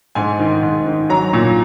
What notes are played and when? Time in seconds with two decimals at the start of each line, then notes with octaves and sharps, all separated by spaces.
0.15 G#2 G#5
0.40 D#3
0.63 G#2
0.86 D#3
1.10 F#3 A#5
1.33 A#2